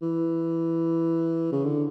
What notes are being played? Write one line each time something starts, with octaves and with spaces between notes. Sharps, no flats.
E3
C#3
D3